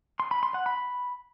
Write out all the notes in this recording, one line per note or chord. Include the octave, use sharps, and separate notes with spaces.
C6
B5
C6
F#5
B5